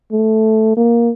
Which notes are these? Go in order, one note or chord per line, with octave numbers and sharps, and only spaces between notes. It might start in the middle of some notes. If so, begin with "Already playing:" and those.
A3
A#3